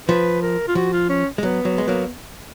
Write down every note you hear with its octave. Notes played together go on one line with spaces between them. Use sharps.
F3 B4
A#4
F4
F3 F#4
F4
C#4
G#3
F#3 B3
F#3
G#3
F#3 A#3